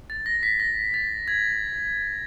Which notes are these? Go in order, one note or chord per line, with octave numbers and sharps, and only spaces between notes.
A6
A#6
B6
A#6
A6
G#6